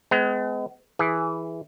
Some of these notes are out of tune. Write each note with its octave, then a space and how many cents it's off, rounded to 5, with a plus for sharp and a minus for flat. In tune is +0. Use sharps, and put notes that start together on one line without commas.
G#3 +20 B3 +45
E3 +0 G#4 +5